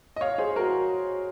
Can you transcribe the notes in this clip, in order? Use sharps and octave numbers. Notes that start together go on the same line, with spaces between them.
D#5
C#5 F5
G#4 C5
F#4 A#4